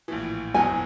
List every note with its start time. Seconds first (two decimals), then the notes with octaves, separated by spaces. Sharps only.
0.08 A#1 A2 E3
0.54 F#1 E2 B2 F#3 G#5